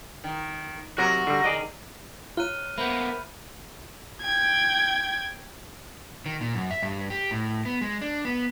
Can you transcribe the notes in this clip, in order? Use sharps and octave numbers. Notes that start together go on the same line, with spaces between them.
D#3
C3 F#3 F#4 A#4 A#6
D3 G3
D#3 G#4 D5 D#5
F4 C#5 A#5 F6 F#6 D#7 G7
A#3 B3 C5 E5 B5 G6 F7
G5 G#6
D#3
A#2
F#2
E5
G2
G4
A2
B3
G#3
D4
B3